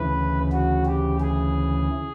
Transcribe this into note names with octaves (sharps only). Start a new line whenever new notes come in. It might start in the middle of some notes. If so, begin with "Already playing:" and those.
Already playing: D2 C#3 E3 B4
F#4
G4
G#4